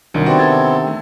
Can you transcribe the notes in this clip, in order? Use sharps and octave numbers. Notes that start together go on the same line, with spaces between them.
C2 D#3 F#3 D4 D#5
C3 B3 C4 F#4 D5
A4 G#6 A6
A3